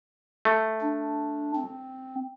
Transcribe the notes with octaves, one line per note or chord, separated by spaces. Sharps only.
A3
D4
C4